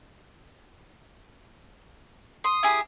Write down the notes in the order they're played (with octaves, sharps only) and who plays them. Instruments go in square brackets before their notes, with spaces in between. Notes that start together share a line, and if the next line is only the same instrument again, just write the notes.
[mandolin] C6 [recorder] D#6
[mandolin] E4 G4 G#4